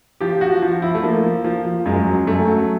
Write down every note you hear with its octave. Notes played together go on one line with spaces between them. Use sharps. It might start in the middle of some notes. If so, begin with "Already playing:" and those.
F3 G4
F3 F#4
F3
F3 E4
A3
F3 A#3
F3
F3
F3
F#2 G#3
F#3
F#2 A3
F#3